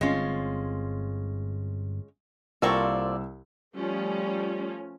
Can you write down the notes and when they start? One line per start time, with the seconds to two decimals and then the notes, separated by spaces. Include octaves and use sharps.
0.01 G1 G2 G#3 C4 C#4 F4
2.62 C2 A#3 C4 F4 A4 D5 C#6 E6
3.76 F3 G3 A3 C#4